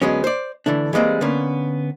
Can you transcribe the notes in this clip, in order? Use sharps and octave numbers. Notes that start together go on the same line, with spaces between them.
D2 F#3 G#3 B3 C#4
C5 D5
D3 E3 A3 D4
E3 G3 G#3 A#3 C4
D3 A#3 B3 C#4